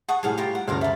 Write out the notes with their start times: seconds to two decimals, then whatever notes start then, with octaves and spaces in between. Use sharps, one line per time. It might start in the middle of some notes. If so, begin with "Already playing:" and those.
0.09 F#5 A5 C#6 D#6
0.23 A2 G3 G#4 F5 F#5
0.37 F4 G4 A#5
0.55 F#5
0.68 D2 G2 C#3 A#4 D5 F5
0.81 E4 D5